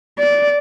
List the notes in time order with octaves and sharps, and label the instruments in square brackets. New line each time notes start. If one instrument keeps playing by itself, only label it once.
[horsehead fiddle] D5